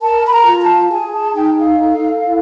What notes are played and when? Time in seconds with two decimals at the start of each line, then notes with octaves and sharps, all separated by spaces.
0.02 A#4 A5
0.25 B5
0.33 A#5
0.47 F4
0.61 A5
0.92 G#4 G#5
1.14 A5
1.35 D#4 G5
1.58 F5
1.81 A4
2.24 E4